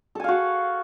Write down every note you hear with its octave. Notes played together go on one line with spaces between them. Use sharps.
F#4 A4 F5 G#5